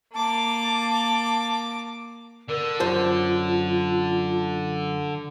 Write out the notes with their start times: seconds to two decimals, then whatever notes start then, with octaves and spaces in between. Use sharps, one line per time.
0.14 A#3 A5 D6
2.49 D3 A#4
2.80 F#2 F4 C5 A5